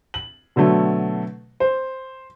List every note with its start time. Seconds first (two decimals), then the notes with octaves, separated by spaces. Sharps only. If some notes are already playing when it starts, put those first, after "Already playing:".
0.14 F#7
0.56 B2 D3 F#3 A3
1.60 C5